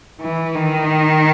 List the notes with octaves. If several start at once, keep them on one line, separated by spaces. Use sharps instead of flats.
E3
D#3